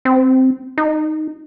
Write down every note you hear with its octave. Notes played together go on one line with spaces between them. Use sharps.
C4
D#4